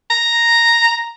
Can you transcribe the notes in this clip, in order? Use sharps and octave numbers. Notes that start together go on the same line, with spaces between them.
A#5